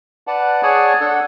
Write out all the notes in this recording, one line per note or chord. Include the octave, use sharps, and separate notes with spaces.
B4 D5 F#5 A5
G#4 C#5 D5 F#5 G#5 A5
D4 A4 F#5